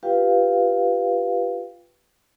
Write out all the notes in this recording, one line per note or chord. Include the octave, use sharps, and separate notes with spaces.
F4 G4 B4 F5 G5